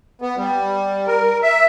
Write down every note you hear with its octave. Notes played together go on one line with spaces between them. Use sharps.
B3
G3
A#4
E5